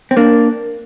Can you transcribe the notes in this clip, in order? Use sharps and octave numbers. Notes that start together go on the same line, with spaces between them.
C4
A#3 D4